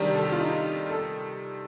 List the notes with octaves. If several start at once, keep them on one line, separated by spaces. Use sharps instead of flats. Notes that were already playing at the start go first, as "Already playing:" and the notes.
Already playing: C3 D#3 G3 D4
A4
G4
F4
D#4
A4